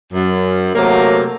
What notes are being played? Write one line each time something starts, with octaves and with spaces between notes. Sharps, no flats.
F#2
C3 F#3 A3 A#3